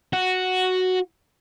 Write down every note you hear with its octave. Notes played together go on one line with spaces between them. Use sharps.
F#4